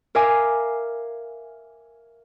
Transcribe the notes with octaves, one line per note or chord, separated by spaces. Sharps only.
A#4 E5 F5 G#5 D6